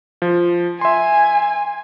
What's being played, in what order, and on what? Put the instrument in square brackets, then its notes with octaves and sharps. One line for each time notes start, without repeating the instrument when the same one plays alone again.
[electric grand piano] F3
[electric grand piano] E5 C6 [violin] G#5